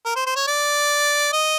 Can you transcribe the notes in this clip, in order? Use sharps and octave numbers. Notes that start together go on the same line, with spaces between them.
A#4
C5
C5
C#5
D5
D#5